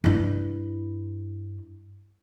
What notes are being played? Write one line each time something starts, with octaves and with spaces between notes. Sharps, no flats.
G2 E4